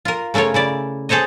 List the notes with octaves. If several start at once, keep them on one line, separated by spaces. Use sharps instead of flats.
F4 A#4
C#3 A3 F4 A#4 C#5
C#3 E4 D5
G#4 A4 C5 C#5 D#5